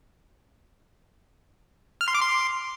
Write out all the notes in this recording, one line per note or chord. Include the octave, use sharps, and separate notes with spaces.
F6
C6
D6
C6